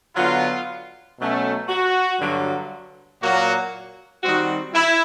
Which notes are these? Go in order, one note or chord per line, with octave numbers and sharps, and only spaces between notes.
D3 F#3 B3 F4
B2 F#3 A3 C#4
F#4
G2 D3 F#3
A#2 F#3 A#3 F#4
D#3 G3 C4 F#4
E4